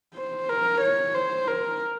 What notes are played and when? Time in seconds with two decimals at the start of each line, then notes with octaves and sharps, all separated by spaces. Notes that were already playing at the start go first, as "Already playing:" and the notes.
0.15 C5
0.49 A#4
0.82 C#5
1.14 C5
1.48 A#4